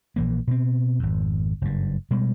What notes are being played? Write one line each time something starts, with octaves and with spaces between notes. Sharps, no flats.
A#1 E3 A#3
B2 C4
G#1 F2
F#1 G2
B2 G3 G#3